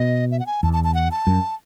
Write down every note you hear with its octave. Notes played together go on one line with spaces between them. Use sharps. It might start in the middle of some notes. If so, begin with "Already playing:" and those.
Already playing: B2 D#5
E5
F#5
G#5
E2 A5
A5
A5
F#5
A5
F#2